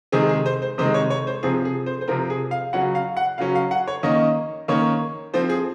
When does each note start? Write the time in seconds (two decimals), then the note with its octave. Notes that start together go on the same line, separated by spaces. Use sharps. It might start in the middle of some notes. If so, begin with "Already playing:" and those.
0.12 C3 D#3 G#3 C4 G#4
0.29 G#4
0.46 C5
0.62 C5
0.78 C3 D#3 G#3 C4 C5
0.94 C#5
1.10 C#5
1.27 C5
1.43 C3 F3 C4 G#4
1.65 G#4
1.86 C5
2.01 C5
2.08 C3 F3 C4 A#4
2.30 G#4
2.51 F5
2.73 C#3 F#3 C#4 F#5
2.95 F5
3.17 F#5
3.38 C#3 F#3 C#4 F5
3.55 F5
3.71 F#5
3.88 C#5
4.03 D#3 A#3 C#4 D#5
4.68 D#3 A#3 C#4 C#5
5.34 F3 C4 C5
5.50 G#4